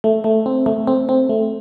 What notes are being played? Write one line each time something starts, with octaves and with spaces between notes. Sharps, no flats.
A3
A3
C4
A3
C4
C4
A3